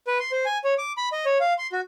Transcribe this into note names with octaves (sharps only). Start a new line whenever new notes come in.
B4
C6
C5
G#5
C#5
D6
B5
D#5
C#5
F5
C6
F#4